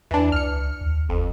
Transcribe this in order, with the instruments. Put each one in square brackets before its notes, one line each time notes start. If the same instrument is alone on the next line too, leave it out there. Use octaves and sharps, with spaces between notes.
[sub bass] E2 [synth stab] E3 D4
[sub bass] C#2 [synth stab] F6 C#7
[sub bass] D#2
[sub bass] F#1 [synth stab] F2